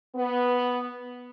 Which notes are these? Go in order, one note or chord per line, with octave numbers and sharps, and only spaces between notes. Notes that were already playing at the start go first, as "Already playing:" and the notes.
B3